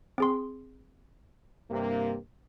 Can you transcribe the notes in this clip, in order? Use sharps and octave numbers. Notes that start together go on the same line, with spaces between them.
C4 G#4 C6
G2 C3 A#3